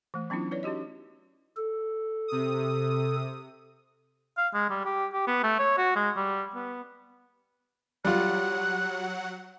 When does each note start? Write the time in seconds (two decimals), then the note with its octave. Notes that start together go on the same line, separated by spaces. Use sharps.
0.14 E3 A3
0.30 F#3 B3 C#4 D4 E4 F4
0.51 E4 B4 C#5 D5
0.63 C#4 D#4 F#4 G4 D#5
1.56 A4
2.28 C3 D#6
4.38 F5
4.54 G#3
4.70 G3
4.85 G4
5.13 G4
5.27 B3
5.43 A3
5.59 C#5
5.78 F#4
5.96 G#3
6.16 G3
6.55 B3
8.05 F#3 G3 F4 F#5 F#6